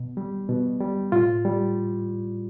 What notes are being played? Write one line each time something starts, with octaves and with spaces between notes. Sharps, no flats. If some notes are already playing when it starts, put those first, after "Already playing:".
Already playing: B2
G3
B2
G3
A2 F4
G3